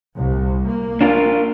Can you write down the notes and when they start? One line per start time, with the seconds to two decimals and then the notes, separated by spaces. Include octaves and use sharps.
0.15 C2
0.65 A#3
1.01 D4 F4 A#4